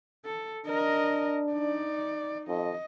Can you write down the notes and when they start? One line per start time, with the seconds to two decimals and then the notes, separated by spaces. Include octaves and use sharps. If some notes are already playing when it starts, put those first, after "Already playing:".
0.25 A4
0.66 D4 A#4 D#5
1.52 D#4 D5
2.48 F2 D#5